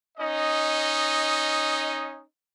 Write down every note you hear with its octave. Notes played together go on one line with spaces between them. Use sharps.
C#4 D#4 D#5